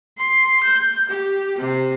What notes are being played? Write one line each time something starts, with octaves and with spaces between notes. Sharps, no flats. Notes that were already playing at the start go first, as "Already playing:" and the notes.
C6
G6
G4
C3